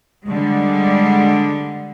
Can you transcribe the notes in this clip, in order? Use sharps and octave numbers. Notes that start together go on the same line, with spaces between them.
D3 G3 G#3